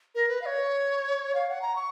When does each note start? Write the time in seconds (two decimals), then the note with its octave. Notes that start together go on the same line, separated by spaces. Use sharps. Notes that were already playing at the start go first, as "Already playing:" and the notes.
0.15 A#4
0.29 B4
0.42 F5
0.46 C#5
1.35 F5
1.49 F#5
1.62 A#5
1.76 C#6